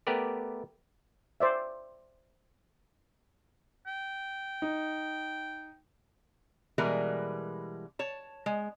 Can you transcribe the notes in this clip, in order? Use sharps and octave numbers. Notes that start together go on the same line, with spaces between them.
A3 B3 G4 A#4 B4 D5
C5 D5 E5
G5
D#4
B2 E3 G3 G#3 A#4
C#5 A5
G#3